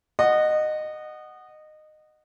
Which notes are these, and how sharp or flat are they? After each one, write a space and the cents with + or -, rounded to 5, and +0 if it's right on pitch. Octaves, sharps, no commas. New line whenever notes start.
D#5 -20 F#5 +0